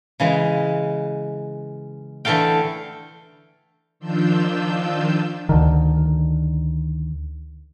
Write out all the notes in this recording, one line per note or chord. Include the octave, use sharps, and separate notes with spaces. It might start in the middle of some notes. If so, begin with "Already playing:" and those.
C#3 E3 G#3
D3 E3 A3 A4 F5 G5
D#3 F3 D4 F4 E6 G6
D2 D3 D#3